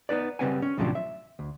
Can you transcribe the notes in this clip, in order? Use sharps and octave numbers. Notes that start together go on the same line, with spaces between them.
B3 D#4 B4 D5
C#3 G3 C4 B4 F#5 G#5
C#4
D#2 A2 C3 F3 F#3 D4
E5
D2